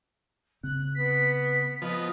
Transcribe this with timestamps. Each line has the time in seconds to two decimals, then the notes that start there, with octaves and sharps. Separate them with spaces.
0.63 C#3 C4 F#6
0.95 B3 B6
1.82 F3 B3 D#5